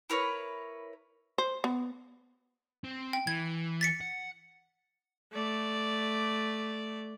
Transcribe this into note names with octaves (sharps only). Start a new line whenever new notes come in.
E4 A#4 B4 C#5
C5
B3
C4
G5
E3 G#6
A6 B6 C#7
F#5
A3 D5